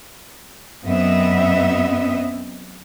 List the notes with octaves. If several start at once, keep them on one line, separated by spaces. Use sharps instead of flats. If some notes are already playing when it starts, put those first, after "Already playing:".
F#2 B3 C4 D#5 E5